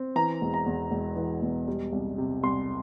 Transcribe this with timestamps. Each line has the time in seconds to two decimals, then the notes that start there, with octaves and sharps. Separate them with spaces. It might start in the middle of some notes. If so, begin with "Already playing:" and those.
Already playing: C4
0.16 E3 A#5
0.41 E1
0.54 A#5
0.66 E2
0.91 E1
1.16 E3
1.42 E1
1.68 G3
1.92 C2
2.18 C3
2.43 C2 C6